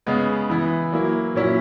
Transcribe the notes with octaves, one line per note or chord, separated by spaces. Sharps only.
C#3 G#3 B3
E3 B3 E4
F#3 A#3 E4
A#2 F#3 C#4 E4